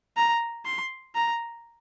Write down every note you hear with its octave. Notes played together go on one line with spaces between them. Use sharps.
A#5
C6
A#5